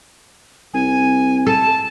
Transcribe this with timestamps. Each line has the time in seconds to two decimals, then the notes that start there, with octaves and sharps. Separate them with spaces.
0.74 C2 G#5
1.46 A4 A5